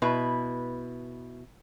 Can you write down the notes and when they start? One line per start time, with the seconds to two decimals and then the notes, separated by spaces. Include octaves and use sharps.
0.02 B2 E4 B4